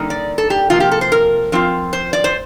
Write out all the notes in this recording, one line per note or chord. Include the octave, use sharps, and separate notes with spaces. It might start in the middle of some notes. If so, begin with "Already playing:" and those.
Already playing: D3 G3 A#3 D#4
D5
A4
G4
C3 F3 A#3 F4
G4
A4
C5
A#4
D3 F3 C4 F4
C5
D5
C5